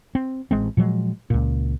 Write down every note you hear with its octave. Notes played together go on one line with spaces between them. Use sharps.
C4
A1 G#3 C4
A#2 F3 F#3 G#3
C#2 A#2